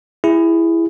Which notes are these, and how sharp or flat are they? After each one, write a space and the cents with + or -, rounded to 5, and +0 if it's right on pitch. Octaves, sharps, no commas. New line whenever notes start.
E4 +10 G#4 -20